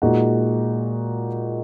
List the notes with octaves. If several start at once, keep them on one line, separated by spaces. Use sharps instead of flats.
A#2 G#3 D#4 F#4